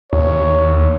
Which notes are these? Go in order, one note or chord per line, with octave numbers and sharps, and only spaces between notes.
D#2 C#5